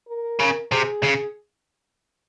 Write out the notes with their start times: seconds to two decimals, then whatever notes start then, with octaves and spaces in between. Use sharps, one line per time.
0.09 A#4
0.40 C#3
0.72 C3 G#4
1.03 C#3